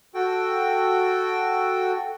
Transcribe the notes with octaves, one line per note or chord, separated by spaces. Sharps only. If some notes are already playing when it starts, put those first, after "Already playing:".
F#4 A4 G5